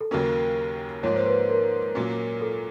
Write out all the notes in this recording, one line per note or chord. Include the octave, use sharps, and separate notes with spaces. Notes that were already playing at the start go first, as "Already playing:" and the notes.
A4
D#2 C#3 F#3 A#3 C#4 A#4
G#2 F3 A#3 C#5
C5
B4
A#4
A#2 F#3 A#3 C#4
A4